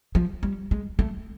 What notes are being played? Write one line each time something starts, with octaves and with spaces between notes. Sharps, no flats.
F3
G3
G#3
A3